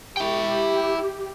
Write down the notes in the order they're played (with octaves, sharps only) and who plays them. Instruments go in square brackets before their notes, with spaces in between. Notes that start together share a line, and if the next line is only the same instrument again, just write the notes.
[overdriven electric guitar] E4 G5 [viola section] G4